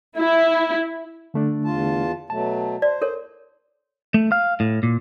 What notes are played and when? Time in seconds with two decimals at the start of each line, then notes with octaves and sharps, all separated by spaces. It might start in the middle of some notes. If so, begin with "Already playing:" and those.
0.18 E4
1.34 D3 A3 D4
1.65 E2 F4 A5
2.30 B2 F#3 A3 A5
2.82 C5 D5
3.02 A4 A#4 C#5
4.14 A3
4.32 F5
4.60 A2
4.83 A#2